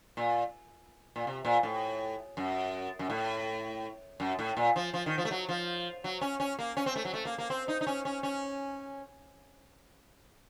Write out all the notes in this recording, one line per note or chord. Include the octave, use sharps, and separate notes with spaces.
A#2
A#2
C3
A#2
A2
F#2
F#2
A2
F#2
A2
A#2
F3
F3
D#3
F3
A3
F#3
F3
F#3
C#4
C#4
A#3
C#4
C4
A3
F#3
A3
A#3
A#3
C4
D#4
D#4
C#4
C#4
C#4